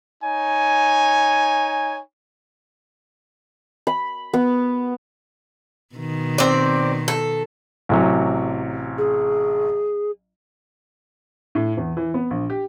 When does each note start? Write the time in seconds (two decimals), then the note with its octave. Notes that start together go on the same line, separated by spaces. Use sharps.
0.24 D#4 C#5 G#5
3.87 B5
4.33 B3
5.95 B2 D#3
6.38 C4 D5
7.08 A4
7.89 A1 C3 F#3
8.98 G#4
11.55 A2
11.77 E2
11.97 E3
12.14 B3
12.31 A#1
12.50 G4